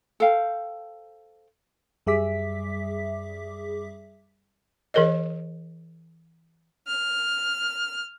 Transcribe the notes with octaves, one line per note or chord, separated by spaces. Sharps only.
A4 C5 F5 G5
F#2 G3 G#4 E5 D6 B6
E3 G#4 A#4 C#5 D#5
F6